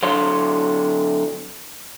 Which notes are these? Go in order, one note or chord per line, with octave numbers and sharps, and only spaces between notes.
D3 F#3 C#5 F5 C6